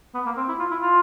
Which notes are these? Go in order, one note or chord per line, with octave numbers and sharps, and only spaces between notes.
B3
A#3
C4
E4
F4
E4
F4